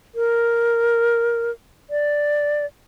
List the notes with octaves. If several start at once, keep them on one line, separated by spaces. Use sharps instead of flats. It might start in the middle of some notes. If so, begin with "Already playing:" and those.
A#4
D5